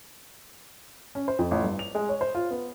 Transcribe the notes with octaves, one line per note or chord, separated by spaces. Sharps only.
C#4
C5
F2
A1
G2
F7
G#3
C#5
C5
F4
B3